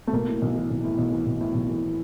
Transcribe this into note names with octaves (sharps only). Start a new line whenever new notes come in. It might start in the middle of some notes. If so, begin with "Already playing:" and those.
A3
B1 A#3
A2
B1
E3
B1
A2
B1
E3
B1
A2
B1
E3